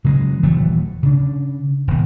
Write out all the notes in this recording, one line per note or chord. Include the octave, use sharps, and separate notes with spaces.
C#3 F#3 G#3
D#1 E3 F#3 A3
C#3 D4
D#1 B2